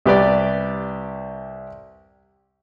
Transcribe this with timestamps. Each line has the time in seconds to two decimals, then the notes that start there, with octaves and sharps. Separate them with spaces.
0.05 C2 G4 B4 D5